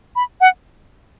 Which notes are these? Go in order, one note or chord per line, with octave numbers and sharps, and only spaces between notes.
B5
F#5